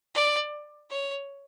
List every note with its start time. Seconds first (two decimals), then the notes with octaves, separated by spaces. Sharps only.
0.14 D5
0.90 C#5